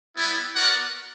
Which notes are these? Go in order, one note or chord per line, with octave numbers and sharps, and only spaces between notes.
G3 B3 E4
B3 F#4 A#4 D5 F#5